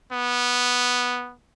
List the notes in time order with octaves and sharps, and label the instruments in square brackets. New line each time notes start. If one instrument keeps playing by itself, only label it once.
[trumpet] B3